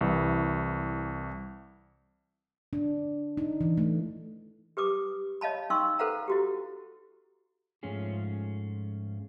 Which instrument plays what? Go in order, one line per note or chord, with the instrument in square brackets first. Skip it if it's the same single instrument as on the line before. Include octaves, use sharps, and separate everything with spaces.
[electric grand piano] C2 E3
[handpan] D4
D#4
E3
A3
[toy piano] G4 B4 D6 D#6
C#5 D#5 F5 A5 B5
C#4 D#4 F5 C6 C#6 E6
A4 B4 C5 F5 F#5 A#5
E4 F#4 G4
[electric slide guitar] G#2 F3 A3 C#4 F4 G#4